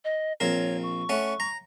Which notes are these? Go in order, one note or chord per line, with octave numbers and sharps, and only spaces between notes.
D#5
A#1 C4 A#4 C#5
C#6
A3 C#4 F#5
A#5